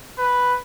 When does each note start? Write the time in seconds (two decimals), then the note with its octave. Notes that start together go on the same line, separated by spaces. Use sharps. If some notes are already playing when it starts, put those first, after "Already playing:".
0.18 B4